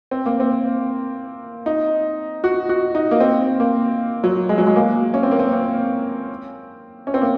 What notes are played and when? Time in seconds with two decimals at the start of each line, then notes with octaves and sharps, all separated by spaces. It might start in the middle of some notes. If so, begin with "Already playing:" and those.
0.11 C4
0.26 A#3
0.40 C4
1.66 D#4
2.44 F#4
2.69 F#4
2.95 D#4
3.11 A#3
3.20 C4
3.60 A#3
4.24 F#3
4.49 G#3
4.58 F#3
4.67 G#3
4.76 A#3
5.14 C#4
5.23 C4
5.31 A#3
5.39 C4
5.53 C4
7.07 C#4
7.14 C4
7.21 A#3